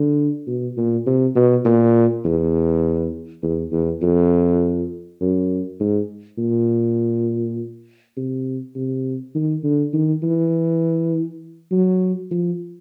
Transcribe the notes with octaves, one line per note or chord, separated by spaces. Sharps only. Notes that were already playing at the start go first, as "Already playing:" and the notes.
Already playing: D3
B2
A#2
C3
B2
A#2
E2
E2
E2
F2
F#2
G#2
A#2
C3
C3
D#3
D3
D#3
E3
F#3
F3